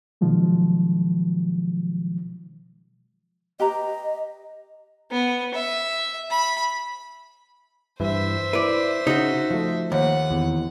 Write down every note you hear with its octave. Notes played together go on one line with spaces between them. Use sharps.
B2 D#3 F3 F#3 G#3
G4 B4 D#5 A#5
B3
E5
B5
G2 E3 E4 C5 E5
E4 B4 D5
C#3 D#4 F#4
F3 A3
D#2 F#5
E2